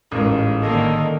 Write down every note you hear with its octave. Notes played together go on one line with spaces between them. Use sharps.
A1 G#2 F4 A#4
D3 D#3 A#3 A4 D#5